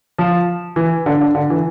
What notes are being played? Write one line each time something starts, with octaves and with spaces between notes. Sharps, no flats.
F3
E3
D3
D3
D3
E3